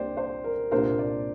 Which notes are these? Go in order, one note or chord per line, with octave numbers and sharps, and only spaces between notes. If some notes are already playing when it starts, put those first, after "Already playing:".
Already playing: C2 C3 A#3 D4 C5 D5 G5
C5
A#4
C2 A#2 A#3 D4 A#4 C5
D5